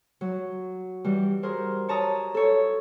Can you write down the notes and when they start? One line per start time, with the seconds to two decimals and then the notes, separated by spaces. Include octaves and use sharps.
0.21 F#3
1.04 E3 G3
1.43 F#4 G#4 A#4 C5
1.89 C#5 A5 A#5 D#6
2.34 A4 C#5